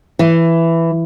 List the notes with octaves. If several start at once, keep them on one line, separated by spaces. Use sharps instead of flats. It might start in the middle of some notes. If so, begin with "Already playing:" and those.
E3